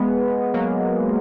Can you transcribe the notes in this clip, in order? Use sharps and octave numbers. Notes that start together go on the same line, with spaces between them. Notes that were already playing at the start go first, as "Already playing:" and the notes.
Already playing: G#3 B3
F#3 A#3